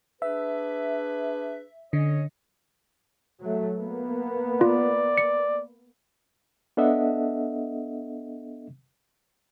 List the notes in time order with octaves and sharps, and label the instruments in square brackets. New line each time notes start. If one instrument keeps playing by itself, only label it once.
[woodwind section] D4 G#4 B4 [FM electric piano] E5
[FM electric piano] D3 [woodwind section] C#4 C#5 D#5
[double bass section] F#3 A3
A#3 B3
[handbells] F4 [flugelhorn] D5
[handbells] C#7
[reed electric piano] B3 D4 A4 D#5 E5 F#5